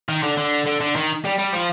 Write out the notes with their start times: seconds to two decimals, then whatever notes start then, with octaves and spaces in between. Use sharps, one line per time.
0.09 D#3
0.23 D3
0.38 D3
0.66 D3
0.81 D3
0.95 D#3
1.25 G3
1.38 G3
1.53 F3